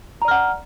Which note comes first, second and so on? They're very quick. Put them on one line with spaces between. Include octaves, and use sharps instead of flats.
A#5 D5 F6 F#5